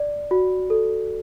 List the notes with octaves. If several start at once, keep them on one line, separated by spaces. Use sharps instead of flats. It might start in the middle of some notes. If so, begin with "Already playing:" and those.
Already playing: D5
F#4
A4